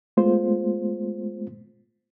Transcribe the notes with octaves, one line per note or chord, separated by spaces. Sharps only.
G#3 A3 B3 F4 C5